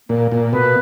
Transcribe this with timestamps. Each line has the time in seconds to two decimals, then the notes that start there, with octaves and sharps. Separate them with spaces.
0.09 A#2 A#3
0.32 A#2
0.53 B2 B4